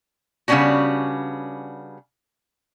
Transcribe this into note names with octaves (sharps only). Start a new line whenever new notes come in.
C#3 G3 B3 C#4 D4 F#4